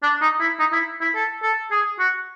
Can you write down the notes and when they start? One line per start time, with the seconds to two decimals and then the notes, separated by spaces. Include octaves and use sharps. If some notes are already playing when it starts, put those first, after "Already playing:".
0.03 D4
0.21 D#4
0.40 E4
0.59 D#4
0.73 E4
1.01 E4
1.15 A4
1.43 A4
1.71 G#4
1.99 F#4